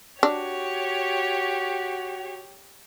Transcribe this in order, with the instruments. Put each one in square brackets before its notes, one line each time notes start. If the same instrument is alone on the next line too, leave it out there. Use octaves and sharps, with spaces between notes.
[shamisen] D4 [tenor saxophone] F#4 [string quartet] G4 C#5